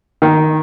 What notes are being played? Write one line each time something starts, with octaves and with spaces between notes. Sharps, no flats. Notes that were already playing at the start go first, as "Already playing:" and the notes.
D#3